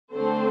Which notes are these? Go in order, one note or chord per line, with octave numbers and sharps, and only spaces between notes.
D3 A3 C4 A4 C5